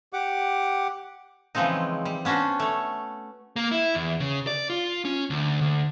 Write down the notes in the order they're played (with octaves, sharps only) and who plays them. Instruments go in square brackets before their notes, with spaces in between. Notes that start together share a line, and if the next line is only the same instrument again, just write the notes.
[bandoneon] G4 F#5 D6
[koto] C#3 E3 F3 G#3 C4 D#4
G3
B3 C#4 D4 F#4 C5
A3 C#5
[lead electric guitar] A#3
E4
E2
C#3
D5
F4
C#4
D2
D2